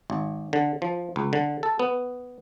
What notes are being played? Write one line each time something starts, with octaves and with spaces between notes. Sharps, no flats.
G#1
D3
F3
C#2
D3
A4
B3